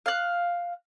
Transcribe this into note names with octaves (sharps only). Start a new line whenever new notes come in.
F5 F#6